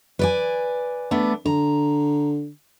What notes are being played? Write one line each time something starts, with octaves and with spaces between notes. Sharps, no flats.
B4 D5 G#5
A3 B3 D4
D3 A#5